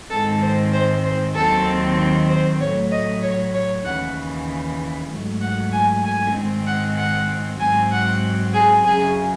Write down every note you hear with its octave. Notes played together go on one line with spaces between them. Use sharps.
G#2 D#3 G#3 C4 A4
C5
C5
C5
D#2 D#3 F#3 C4 A4
C5
A2 F#3 A3 C#5
D#5
C#5
C#5
D#2 C#3 E3 F#5
G#2 F#3 A3
F#5
G#5
G#5
G#2 D#3 G#3 C4
F#5
F#5
G#2 F#3 C4 G#5
F#5
G#4
F#2 C#3 F#3 G#4